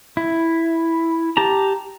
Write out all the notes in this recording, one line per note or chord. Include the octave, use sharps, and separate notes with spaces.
E4
G4 A5 A#5